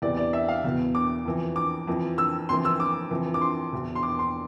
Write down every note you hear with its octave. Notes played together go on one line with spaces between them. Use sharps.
E2 C3 E3 D5
D5
E5
F5
E2 B2
D6
F2 E3
D6
F2 E3
E6
F2 E3 C6
E6
D6
F2 E3
D6
C6
E2 B2
C6
D6
C6